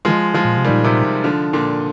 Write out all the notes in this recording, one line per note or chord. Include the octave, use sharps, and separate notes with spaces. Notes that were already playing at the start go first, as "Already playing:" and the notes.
D#3 F3 G#3
F3 G#3
A#2
C3
A#2 D#3 G3
C3 D#3
D3 F3
A#2 D3